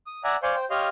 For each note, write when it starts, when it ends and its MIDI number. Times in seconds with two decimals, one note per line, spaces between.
0.07 0.22 87
0.24 0.36 74
0.24 0.36 76
0.24 0.36 78
0.24 0.36 80
0.24 0.36 82
0.43 0.55 72
0.43 0.55 74
0.43 0.55 77
0.43 0.55 80
0.43 0.55 84
0.43 0.55 85
0.55 0.65 72
0.55 0.65 79
0.70 0.89 67
0.70 0.89 73
0.70 0.89 75
0.70 0.89 77
0.70 0.89 84
0.70 0.89 89